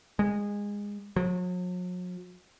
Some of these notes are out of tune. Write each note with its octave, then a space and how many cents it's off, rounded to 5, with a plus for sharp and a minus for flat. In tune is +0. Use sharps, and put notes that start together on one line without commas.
G#3 -20
F#3 -45